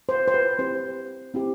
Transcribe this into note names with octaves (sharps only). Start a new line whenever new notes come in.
C5
C5
B4
C4 E4 G4 C5
C4 E4 G4